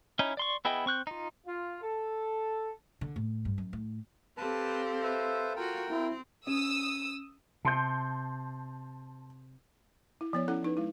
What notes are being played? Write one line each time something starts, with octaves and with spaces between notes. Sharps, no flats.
C#4 D#4 E4 D#5
D5 C6 C#6
B3 E4 G#4 D#5 G5
C4 C#6 F#6 G6
D#4 F4
F4
A4
D3
A2
G2
F#2
A2
C4 G4 A4 B4 F5 A5
B4 C5 E5
F4 F#4 A#4 G5
C4 E4
C#4 D#6 E6
C3 A5 C6 G6
E4
F3 B3 C#5
C#4 E4 A4 F#5
F3 D#4 B4
G#3 E4